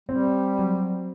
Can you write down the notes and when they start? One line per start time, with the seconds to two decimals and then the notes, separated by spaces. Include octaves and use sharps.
0.09 G3 C4
0.59 F#3